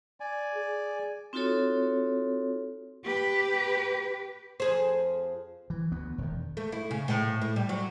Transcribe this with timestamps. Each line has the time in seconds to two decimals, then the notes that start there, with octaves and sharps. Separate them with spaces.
0.20 D5 G#5
0.55 G#4
1.33 C4 D#4 F4 F#4 A4 C#5
3.04 G4 B4
4.60 F2 G#4 C5
5.70 E3
5.91 D2 B3
6.18 E1 D#3
6.57 A3
6.72 E4
6.91 C#3
7.08 A2
7.41 A2
7.56 G3
7.69 F#3